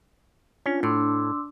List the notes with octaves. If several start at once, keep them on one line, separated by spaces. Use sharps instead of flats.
C#4 D4 F4
A2 C6 D6 E6